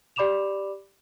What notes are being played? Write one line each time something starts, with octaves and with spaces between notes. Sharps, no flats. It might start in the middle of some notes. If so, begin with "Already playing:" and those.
G4 D5 B5 D6 E7 F7